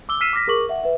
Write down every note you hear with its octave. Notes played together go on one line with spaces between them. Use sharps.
D6 E6 G7
E6 F6 B6 C7 D#7 E7
D6 F6 A#6 B6
G#4 A#4 C#6 D6 F#7
E5 F#5
B4 E5